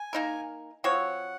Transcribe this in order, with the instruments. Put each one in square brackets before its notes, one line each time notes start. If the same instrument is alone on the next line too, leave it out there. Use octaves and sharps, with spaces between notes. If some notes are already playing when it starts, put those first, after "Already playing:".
Already playing: [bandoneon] G#5
[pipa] A#3 D#4 A#4
[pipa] F3 C4 F#4 C#5 [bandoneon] F#5